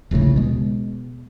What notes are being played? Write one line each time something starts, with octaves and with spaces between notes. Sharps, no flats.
D#1 A#1 A2 C#3
B2 G#3